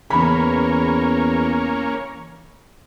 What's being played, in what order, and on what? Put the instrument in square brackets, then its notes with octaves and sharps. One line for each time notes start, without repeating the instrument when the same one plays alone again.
[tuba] E2 [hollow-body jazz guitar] C#3 E3 [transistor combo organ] A#3 C#4 [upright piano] B5